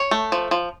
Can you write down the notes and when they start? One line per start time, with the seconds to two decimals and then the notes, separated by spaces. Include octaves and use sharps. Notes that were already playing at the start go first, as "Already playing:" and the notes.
Already playing: C#5
0.11 A3
0.32 F3
0.51 F3